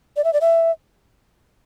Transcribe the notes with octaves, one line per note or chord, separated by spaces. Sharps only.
D5
E5
D5
E5